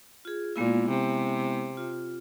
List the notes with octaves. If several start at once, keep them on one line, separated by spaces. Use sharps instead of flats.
F4 G#4
A#2 G#3 B3 E4
C3
F4